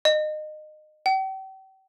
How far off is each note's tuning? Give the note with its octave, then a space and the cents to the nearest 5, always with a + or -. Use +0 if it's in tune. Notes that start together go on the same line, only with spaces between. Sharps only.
D#5 -25
G5 -40